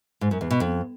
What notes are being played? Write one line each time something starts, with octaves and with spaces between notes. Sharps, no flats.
G#2
F#2
E2
B2
F2